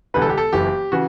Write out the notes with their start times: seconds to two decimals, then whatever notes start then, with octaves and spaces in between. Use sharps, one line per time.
0.14 E1 E2 D3 G3 B4
0.22 A4
0.30 G4
0.38 A4
0.53 F#1 F#2 E3 G4
0.92 C#3 E3 F#4